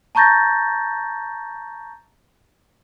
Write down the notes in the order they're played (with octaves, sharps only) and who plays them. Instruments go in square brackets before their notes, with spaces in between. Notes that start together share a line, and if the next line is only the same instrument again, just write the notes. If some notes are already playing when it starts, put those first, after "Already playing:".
[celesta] A5 A#5 C#6 G6 A6 A#6